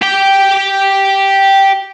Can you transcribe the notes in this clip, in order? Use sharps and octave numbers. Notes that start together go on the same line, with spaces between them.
G4 G5